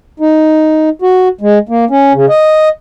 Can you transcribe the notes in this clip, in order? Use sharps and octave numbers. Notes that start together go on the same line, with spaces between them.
D#4
F#4
G#3
A#3
C#4
C#3
D#5